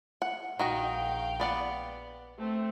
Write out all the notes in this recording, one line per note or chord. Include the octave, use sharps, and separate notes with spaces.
F#5
A#1 D#3 F#4 D#5 F5 G5
B3 D5 F#5
A3 C4